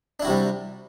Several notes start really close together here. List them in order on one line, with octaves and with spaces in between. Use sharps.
D4 E4 F#4 C3 G3